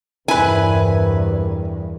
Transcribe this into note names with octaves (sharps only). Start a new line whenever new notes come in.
E2 G2 C3 E4 A#4 B4 G#5